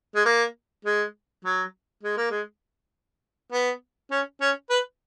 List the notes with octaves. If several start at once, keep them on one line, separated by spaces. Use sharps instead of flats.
G#3
A#3
G#3
F#3
G#3
A#3
G#3
B3
C#4
C#4
B4